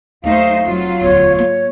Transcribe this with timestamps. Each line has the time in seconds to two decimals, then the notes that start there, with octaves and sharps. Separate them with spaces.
0.24 D#2 F#3 A3 D#4 C5 F5
0.65 F1 F#3 F4
1.01 E1 D2 C#5
1.35 G#2 A#3 C#5